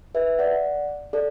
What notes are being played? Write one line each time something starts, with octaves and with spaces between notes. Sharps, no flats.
B4 E5
D5 F#5
A4 D5